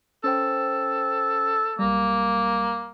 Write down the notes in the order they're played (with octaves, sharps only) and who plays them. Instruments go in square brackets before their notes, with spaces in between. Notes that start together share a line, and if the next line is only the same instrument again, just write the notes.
[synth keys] C#4 C5 G5 [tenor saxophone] A4
[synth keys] B1 G3 [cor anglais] A#3